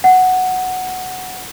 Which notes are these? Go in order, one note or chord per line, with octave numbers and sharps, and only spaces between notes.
F#5